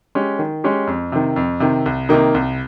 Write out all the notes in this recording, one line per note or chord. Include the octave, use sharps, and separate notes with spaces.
G#3 C#4 G4
D#3
G#3 C#4 G4
F2
C3 D#3
F2
C3 D#3
C2
C3 D#3 A#3 D#4
C2